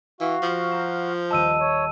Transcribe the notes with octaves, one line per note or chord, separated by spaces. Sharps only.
E3 F#4 F5
F3
A#5 E6 G6
D#1 D#5 A5 E6 D#7
C#5